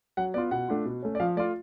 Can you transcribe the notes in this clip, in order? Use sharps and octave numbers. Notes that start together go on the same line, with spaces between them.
F#3 F#5
B3 F4 D5
B2 F#5
A3 D4 F4
B2
A3 C#4
D5
F3 F5
A3 F4 D5